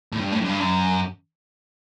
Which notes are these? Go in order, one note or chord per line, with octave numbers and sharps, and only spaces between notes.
A2
G2
A2
F#2
G2
F#2